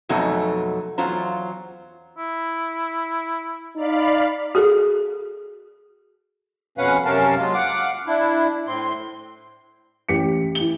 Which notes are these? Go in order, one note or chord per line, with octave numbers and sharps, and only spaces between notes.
F2 B2 F#3 A3 D#4 G#5
E2 F#3 F4 C5 A#5
E4
D#4 D5 F5 B5
F#4 G#4 A4
F2 B2 C#4 B4 F5 F#5
F#2 C3 C#4 A#4 F5 A5
F#3 G#3 A#3 F4
F5 F#5 D6
D4 E4
A2 C4 C6
A1 G4 B6 C#7
E3 G7